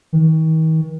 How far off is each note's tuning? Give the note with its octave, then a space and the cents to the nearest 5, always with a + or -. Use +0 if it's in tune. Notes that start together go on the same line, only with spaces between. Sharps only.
D#3 +40